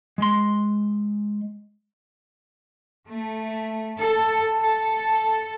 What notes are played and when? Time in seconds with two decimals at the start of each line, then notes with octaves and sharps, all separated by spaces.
0.18 G#3 C6
3.08 A3
3.98 A4
4.59 A4